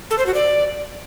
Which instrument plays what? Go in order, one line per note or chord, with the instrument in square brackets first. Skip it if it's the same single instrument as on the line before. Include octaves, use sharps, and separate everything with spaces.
[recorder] A4
C5
F#4
D5